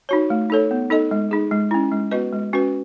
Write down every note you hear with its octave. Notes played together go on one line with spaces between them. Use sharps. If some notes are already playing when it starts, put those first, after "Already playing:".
D#4 F#4 C#5
A3
D#4 A4 C#5
B3
D#4 A4 D#5
G#3
D#4 G#4
G#3
C#4 E4
G#3
B3 F#4 B4 D#5
G#3
C#4 F#4 B4